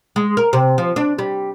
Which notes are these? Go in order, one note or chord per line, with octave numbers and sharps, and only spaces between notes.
G#3
A#4
C3
F3
D4
G3